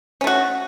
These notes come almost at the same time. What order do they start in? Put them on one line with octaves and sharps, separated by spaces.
C#4 A3 F#4